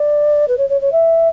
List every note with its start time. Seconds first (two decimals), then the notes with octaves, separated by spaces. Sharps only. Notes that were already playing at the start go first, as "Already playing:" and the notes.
Already playing: D5
0.48 B4
0.57 C#5
0.69 C#5
0.81 C#5
0.92 E5